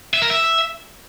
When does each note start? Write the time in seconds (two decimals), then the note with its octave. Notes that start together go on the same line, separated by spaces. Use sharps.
0.14 E5
0.22 A#4
0.30 E5